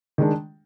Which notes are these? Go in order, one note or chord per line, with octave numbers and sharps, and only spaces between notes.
D#3 G#3 D4